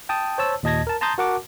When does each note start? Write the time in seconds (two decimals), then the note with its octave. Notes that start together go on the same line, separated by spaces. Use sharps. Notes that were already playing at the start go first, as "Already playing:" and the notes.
0.09 G5 A5 D#6
0.38 C5 C#5 A5 E6
0.63 D#2 A#2 D#5 A5 G#6 A#6
0.87 A#4 A5
1.01 A5 A#5 C6 D#6 G6 A6
1.18 F#4 A#4 F#5 A5 D6